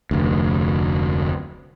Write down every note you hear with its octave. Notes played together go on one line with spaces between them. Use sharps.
F1 D2